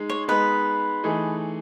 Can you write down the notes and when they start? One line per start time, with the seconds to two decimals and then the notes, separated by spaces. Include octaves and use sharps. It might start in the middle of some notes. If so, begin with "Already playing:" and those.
Already playing: G#3 D#4 G#4
0.10 C#5
0.28 G#3 B3 D#4 B4
1.04 E3 A3 D#4 G#4